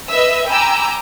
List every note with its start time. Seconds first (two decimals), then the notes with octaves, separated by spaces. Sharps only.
0.10 B4 D#5 E5 E6
0.47 G5 G#5 A#5 B5 D6 E6